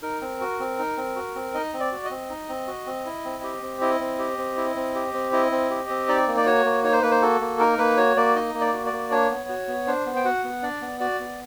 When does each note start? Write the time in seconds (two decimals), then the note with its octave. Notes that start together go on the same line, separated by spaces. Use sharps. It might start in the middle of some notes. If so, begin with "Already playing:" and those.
0.02 D#4 A#4
0.22 C4
0.41 F#4
0.60 C4
0.79 D#4
0.97 C4
1.16 F#4
1.35 C4
1.54 D#4 D#5
1.74 C4
1.80 D5
1.92 F#4
2.05 D#5
2.11 C4
2.30 D#4
2.49 C4
2.68 F#4
2.86 C4
3.06 E4
3.25 C4
3.43 G4
3.62 C4
3.81 E4 D#5
4.00 C4
4.19 G4
4.38 C4
4.57 E4
4.76 C4
4.95 G4
5.14 C4
5.33 E4 D#5
5.52 C4
5.70 G4
5.89 C4
6.09 D#4 D5
6.27 A#3
6.37 D5
6.46 F#4 C#5
6.66 A#3
6.84 D#4 C#5
6.93 C5
7.02 A#3 B4
7.11 C5
7.22 F#4 A4
7.41 A#3
7.60 D#4 A#4
7.78 A#3 B4
7.97 F#4 C#5
8.17 A#3 D5
8.35 D#4 D#5
8.54 A#3
8.61 D5
8.73 F#4
8.86 D5
8.93 A#3
9.11 D4 C#5
9.30 B3
9.49 F#4
9.68 B3
9.87 D4 C5
10.06 B3
10.16 G5
10.25 F#4 F#5
10.44 B3
10.63 D4 D5
10.82 B3
11.00 F#4 D5
11.20 B3